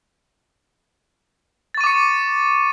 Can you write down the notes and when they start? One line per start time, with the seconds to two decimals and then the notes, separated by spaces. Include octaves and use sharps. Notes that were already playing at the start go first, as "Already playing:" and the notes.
1.74 A6
1.78 C#6
1.81 D#7
1.84 D6
1.87 C#7